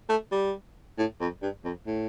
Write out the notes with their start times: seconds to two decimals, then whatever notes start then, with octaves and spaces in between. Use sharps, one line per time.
0.09 A3
0.32 G3
0.98 A2
1.21 F2
1.42 G2
1.65 F2
1.87 A2